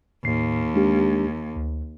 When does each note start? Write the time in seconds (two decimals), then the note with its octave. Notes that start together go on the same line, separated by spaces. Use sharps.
0.25 D#2 A2 C7
0.75 G#3 D4 G4
1.56 D2